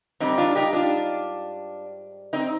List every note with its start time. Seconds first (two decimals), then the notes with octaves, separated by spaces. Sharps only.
0.20 G#2 D#3 G3 C4 D#4
0.38 D4 F4
0.56 D#4 G4
0.73 D4 F4
2.33 C4 D#4